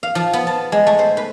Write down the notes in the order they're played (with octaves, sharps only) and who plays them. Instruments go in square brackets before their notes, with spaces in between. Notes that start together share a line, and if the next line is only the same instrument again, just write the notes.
[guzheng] F5
F3
B3
A5
G#3
A3
C5
B4